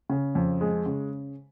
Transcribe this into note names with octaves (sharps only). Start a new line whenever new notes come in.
C#3
F2
G#3
C#3